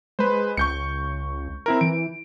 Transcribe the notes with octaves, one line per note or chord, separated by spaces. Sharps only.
G#3 B4 C5
C#2 C#6 G6 C#7
C4 E4 A#4
E3 D7